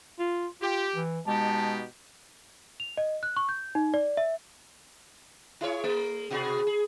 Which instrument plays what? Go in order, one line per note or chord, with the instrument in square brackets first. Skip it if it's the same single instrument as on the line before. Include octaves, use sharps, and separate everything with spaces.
[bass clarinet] F4
[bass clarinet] F4 [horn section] G4
[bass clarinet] E3
[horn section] B2 D#4 G4 [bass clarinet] G#3 [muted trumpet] A5
[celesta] F7
D#5
F#6
C#6
G6
D#4
D5
E5
[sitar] E4 G#4 C#5
A3
B2 F#4 G#4
G#4